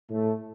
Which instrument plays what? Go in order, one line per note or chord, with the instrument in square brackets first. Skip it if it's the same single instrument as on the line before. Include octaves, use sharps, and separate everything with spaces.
[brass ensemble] A2 A3